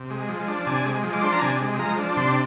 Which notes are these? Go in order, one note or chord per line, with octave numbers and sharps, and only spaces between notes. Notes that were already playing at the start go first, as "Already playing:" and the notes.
Already playing: C3
G#3
F3
D4
C3 G#5
G#3
F3
D6
D4 C6
A#5
C3 G#5
G#3
F3 A#5
D4
C3 C6